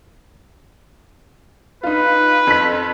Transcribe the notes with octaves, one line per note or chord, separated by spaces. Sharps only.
D#4 F4 B4
F2 B6